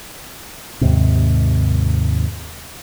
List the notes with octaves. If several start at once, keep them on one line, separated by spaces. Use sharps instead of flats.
D#2 G#2 C3